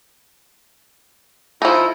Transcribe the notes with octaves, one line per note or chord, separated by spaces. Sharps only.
F3 D#4 E4 A4